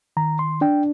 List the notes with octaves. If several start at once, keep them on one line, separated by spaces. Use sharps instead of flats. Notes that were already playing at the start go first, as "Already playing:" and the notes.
D#3 A#5
C6
D4 G5